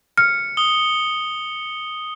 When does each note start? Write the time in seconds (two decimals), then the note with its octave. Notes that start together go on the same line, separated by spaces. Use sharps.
0.18 F6 C#7
0.57 D#6 G7